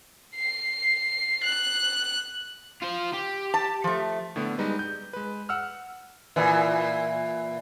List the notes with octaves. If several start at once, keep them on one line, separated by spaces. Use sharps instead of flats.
C7
F#6
F4 C5
G4
A5
F3 A3
A2 D3 A3 B3
G3 G#3 D#4 B4
G6
G#3 B4
F#5 E6 F6
A#2 E3